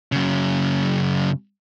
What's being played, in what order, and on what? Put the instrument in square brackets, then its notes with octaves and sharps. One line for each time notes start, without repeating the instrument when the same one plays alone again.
[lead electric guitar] F#2 C#3